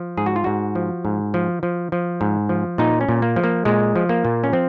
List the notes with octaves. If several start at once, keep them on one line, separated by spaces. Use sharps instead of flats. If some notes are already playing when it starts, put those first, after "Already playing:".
Already playing: F3
G#2 G#4
F#4
F4
G#2 F#4
F3
G#2
F3
F3
F3
G#2
F3
A#2 D#4
C#4
A#2
A#3
F3
A#3
A#2 G#3
F3
A#3
A#2
C#4
F3 C4